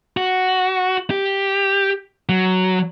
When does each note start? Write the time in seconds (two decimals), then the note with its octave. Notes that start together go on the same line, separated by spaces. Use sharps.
0.17 F#4
1.11 G4
2.29 F#3